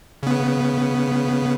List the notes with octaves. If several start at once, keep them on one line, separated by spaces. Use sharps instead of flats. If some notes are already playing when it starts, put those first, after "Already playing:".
C#3 B3